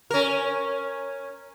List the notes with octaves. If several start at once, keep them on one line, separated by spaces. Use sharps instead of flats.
C#4 A#4